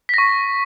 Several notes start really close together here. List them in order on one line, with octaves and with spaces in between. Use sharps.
B6 A#6 C#6